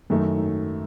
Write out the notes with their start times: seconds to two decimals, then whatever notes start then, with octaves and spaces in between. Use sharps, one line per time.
0.10 F#2 D#3 F#3 A3 D#4 A4
0.36 G#2